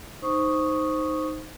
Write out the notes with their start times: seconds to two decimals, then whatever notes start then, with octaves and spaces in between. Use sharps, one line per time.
0.22 D#4 C5 C#6 D#6